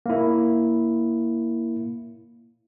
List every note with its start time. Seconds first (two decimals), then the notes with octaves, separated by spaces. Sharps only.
0.06 A#3 E4